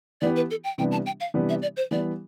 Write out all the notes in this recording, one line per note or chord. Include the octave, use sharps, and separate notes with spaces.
E3 B3 E4 G4 D5
B4
A4
G5
C3 E3 G3 B3 D4 G5
A5
G5
F5
C3 E3 G3 B3 D4
E5
D5
C5
E3 G3 B3 D5